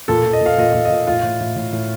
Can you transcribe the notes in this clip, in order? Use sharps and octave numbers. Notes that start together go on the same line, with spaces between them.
A#2 A4
A#2
D#5
A#2 F5
A#2 D#5
A#2 F5
D#5
A#2
A2 F4
A2
A2
A2
A2